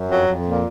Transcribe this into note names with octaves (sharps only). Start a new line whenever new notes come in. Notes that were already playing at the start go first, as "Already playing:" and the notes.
Already playing: F#2
F2 F#3
F2
A#2